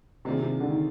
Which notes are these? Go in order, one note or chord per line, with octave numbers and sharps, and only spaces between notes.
C3 D#3 A#3 D4 F4 G#4
C3
D3
D#3